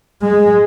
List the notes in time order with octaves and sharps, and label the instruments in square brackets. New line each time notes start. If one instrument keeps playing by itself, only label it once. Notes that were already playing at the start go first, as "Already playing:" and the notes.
[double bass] G#3